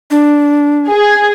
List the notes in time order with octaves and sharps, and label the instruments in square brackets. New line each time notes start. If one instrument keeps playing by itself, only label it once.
[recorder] D4
[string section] G#4